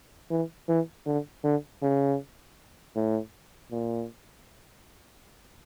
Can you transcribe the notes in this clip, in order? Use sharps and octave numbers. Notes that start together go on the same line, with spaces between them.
E3
E3
D3
D3
C#3
A2
A#2